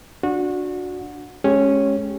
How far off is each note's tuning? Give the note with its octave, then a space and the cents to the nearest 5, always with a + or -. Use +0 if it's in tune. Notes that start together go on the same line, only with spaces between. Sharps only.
D4 +0 F#4 -25
G#3 +35 C#4 +0 G4 +0